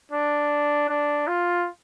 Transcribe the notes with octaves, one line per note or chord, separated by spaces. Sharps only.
D4
D4
F4